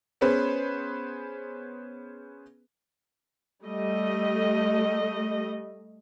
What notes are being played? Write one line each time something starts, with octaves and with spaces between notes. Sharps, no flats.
B3 C#4 G#4 B4 C5
G3 A3 D#5